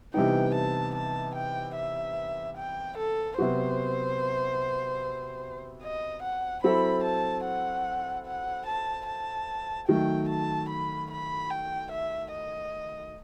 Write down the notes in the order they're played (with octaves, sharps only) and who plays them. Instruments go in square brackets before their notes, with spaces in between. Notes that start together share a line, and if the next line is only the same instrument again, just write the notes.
[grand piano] C3 E3 G3 B3 D#4 [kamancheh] G5
[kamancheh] A5
A5
G5
E5
G5
A4
[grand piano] C3 F#3 B3 F#4 [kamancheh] C5
[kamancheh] D#5
F#5
[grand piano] F#3 C4 E4 A4 [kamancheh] B5
[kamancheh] A5
F#5
F#5
A5
A5
[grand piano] D#3 F#3 A3 [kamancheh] G5
[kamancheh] A5
B5
B5
G5
E5
D#5